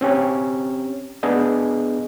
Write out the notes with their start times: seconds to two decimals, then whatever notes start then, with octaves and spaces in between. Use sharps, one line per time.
0.01 C4 C#4 G4
1.23 B3 D4 G#4 D#5